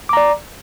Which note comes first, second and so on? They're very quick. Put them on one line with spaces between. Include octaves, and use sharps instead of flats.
D6 A#5 D5